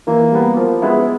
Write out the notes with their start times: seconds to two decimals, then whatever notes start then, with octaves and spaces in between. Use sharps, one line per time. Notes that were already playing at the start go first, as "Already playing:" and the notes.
0.07 E3 A#3
0.32 G3 B3
0.57 F3
0.82 G#3 B3 E4